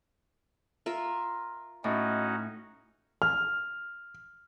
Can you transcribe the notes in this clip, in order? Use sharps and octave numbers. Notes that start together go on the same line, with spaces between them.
F4 A#4 E5
A2 C#4 D#4 F#4 D#5
F6